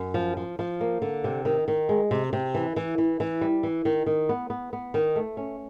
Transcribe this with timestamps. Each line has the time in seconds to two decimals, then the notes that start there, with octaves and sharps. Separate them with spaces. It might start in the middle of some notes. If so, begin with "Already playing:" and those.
Already playing: F#2
0.14 F3
0.37 F3
0.59 F3
0.80 A#3
1.02 D3
1.24 C3
1.45 D#3
1.68 D#3
1.89 G#3
2.11 C3
2.33 C3
2.54 E3
2.76 E3
2.98 E3
3.20 E3
3.41 G3
3.63 E3
3.85 D#3
4.06 D#3
4.29 B3
4.50 B3
4.73 B3
4.94 D#3
5.16 A3
5.37 C#4